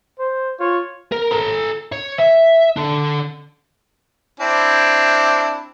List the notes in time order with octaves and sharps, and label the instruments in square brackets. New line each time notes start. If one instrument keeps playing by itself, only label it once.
[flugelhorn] C5
[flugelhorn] F4 [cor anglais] C#5
[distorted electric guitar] A#4
A4 A#5
C#5
E5
D4 A4
[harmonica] C4 D4 E4